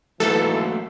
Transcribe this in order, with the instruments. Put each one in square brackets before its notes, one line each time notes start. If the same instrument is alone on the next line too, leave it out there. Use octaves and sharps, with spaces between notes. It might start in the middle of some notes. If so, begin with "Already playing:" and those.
[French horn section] G#2 E3 [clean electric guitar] F#3 A3 A#3 [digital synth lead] A4